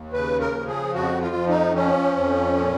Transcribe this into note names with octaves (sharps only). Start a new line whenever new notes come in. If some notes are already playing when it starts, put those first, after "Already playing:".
Already playing: D#2
C#3 B4
A#4
F3
G#4
F2 F#4
F4
F3
D#4
F3 C#4
F2
A#2